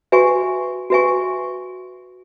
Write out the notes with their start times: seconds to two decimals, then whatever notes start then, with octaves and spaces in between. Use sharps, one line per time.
0.12 F#4 B4 E5 G#5 C#6
0.90 F#4 B4 E5 G#5 C#6